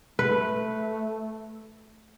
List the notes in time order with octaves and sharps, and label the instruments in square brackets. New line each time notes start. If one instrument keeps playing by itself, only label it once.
[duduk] A3 [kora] B4